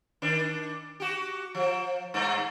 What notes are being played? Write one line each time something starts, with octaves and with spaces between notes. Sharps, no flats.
D#3 D4
F#4 G4
F3
G2